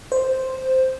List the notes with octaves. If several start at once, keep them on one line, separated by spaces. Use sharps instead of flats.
C5